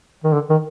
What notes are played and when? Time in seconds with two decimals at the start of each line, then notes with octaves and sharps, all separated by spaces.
0.24 D#3
0.33 D3
0.50 D#3